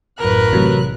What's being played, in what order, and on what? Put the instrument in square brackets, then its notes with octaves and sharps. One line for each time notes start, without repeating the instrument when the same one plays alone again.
[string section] A1 F#2 F#6 [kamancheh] A#4 B4
[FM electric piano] C3 E3 A3 [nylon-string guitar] F#3